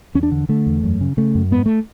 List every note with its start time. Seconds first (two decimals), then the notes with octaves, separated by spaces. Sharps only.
0.15 E2 C#4
0.23 D4
0.31 D3
0.49 D3 A3
0.67 E2
0.83 F#2
1.01 C#3
1.17 C#3 A3
1.35 F#2
1.51 G#2 B3
1.66 A3